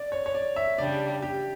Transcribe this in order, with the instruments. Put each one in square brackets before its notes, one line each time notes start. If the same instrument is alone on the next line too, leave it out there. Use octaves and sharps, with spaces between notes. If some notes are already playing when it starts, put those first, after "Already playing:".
Already playing: [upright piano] D5
C#5
C#5
D5
E5
[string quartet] C#3 G3 D4 [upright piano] D5
[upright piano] G4